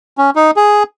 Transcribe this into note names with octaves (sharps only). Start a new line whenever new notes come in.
C#4
D#4
G#4